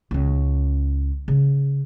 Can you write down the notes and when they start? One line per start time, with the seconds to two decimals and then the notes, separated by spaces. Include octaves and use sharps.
0.11 C#2 C#4
1.28 C#3